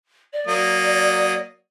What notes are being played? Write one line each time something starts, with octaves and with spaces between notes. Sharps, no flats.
D5
F#3 A#3 D#6